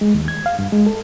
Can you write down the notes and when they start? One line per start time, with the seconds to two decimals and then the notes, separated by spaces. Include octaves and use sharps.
0.01 G#3
0.15 D#2
0.28 G#6
0.46 F5
0.59 G2
0.73 G#3
0.86 A4